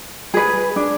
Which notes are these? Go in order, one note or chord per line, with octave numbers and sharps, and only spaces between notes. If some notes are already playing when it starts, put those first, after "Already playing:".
G#4 B4
D4